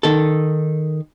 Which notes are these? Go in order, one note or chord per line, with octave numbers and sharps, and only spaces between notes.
D#3 A4